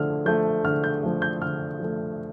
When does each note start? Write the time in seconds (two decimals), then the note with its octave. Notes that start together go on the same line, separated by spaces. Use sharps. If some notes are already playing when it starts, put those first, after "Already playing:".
Already playing: D3 F3 A3 F6
0.26 F3 A3 G6
0.65 D3 F6
0.84 G6
1.03 F3 A3
1.22 G6
1.42 D3 F6
1.80 F3 A3